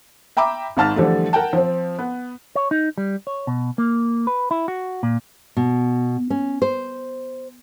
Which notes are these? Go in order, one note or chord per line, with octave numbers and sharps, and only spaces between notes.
E5 G5 A#5 B5 D6
G#1 G#2 A5 F6 A6
D3 E3 F3 G3 A3
A#4 F#5 G5 A5
F3 C4
B3
C#5
D#4
G3
C#5
B2
A#3
B4
E4
F#4
A#2
B2
C#4
C5